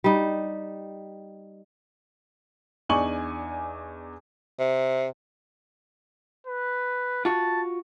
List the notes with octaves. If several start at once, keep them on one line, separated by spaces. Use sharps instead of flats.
G3 D#4
E2 D4 D#4 G#5 C#6 F#7
C3
B4
F4 F#4 A5